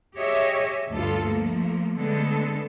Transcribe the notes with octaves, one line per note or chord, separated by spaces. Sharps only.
G4 G#4 C#5 D#5 E5
D2 G2 G3 B3 F4 A4
F3 A3 A#3
D3 G#3 A3 B3 A4